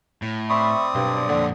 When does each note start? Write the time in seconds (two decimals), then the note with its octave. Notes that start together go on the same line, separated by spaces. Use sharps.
0.22 A2
0.49 C4 D5 E5 B5 C#6 D#6
0.95 B1 G2
1.29 F2 A#2 D3